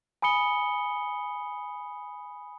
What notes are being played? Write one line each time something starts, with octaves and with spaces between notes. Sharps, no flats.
G#5 B5 D#6 C#7 G7